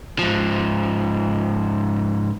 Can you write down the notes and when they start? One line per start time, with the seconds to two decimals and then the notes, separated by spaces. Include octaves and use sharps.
0.19 G#2 F3